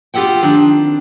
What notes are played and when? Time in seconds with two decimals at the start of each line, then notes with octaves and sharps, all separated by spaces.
0.14 B3 F4 G4 A4 F#5 G5
0.43 D#3 C4 D4